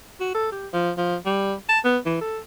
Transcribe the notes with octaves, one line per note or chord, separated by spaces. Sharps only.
F#4
A4
G4
F3
F3
G3
A5
B3
E3
A4